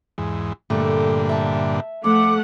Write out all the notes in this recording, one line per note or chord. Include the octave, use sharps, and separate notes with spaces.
E2 G#2
G2 A#2 D3 A3
E5 A5
F2 A3 F#5 D6